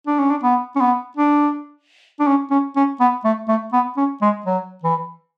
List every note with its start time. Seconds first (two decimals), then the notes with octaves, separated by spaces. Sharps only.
0.07 D4
0.19 C#4
0.30 D4
0.43 B3
0.76 C#4
0.80 B3
1.17 D4
2.20 D4
2.27 C#4
2.50 C#4
2.76 C#4
3.00 B3
3.24 A3
3.48 A3
3.73 B3
3.97 C#4
4.22 G#3
4.46 F#3
4.83 E3